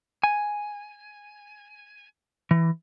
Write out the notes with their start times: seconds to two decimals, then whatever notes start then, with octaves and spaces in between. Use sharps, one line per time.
0.24 G#5
2.51 E3